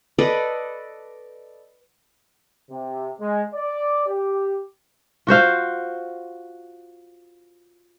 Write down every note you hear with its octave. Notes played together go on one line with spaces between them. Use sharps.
A4 B4 D5 D#5
C3
G#3
D5
G4
F4 F#4 C5 F5